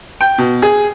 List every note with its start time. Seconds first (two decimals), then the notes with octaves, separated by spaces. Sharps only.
0.21 G5
0.38 B2
0.62 G#4